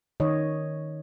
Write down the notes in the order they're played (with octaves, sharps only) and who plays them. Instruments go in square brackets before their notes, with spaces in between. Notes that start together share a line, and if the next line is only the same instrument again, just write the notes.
[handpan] D#3 C#5 D#5